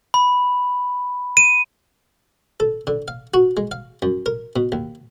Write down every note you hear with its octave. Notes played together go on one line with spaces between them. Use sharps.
B5
D#7
A4
D3
F5
F#4
G#3
F5
F#2
A#4
B2
D#2